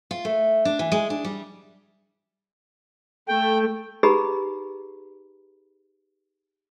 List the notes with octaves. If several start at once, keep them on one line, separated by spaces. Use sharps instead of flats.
F4
A3
D4
E3
G#3
D4
G3
A3 G5
D#4 G4 G#4 B4 A#5 B5